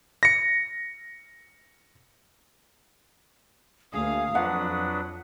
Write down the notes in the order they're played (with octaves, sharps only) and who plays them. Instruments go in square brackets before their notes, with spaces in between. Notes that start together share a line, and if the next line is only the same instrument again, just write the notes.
[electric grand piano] A#6 C#7
[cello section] D2 A#3 F5 [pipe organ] G#4 [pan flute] D#6
[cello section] F2 [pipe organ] F#3 D4 B4 [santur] F#5